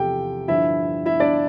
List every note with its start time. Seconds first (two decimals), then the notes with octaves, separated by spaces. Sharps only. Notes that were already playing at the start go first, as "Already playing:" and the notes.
Already playing: E2 C3 F3 G4 A4 G5
0.48 G2 D3 F3 E4 E5
1.06 E4 E5
1.20 D4 D5